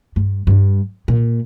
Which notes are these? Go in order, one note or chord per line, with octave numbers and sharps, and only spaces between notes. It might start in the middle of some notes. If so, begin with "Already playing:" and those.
G2
G2
A#2